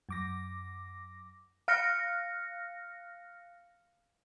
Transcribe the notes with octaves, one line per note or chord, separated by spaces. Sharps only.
F#2 D6 A#6
F5 F6 F#6 A#6 C#7